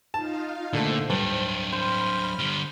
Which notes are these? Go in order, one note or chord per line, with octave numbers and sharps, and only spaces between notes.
D#4 F4 F5 A5
A#2 D3 A3 C5
G2 F#3 D4
C5 B5 F6
D3 G3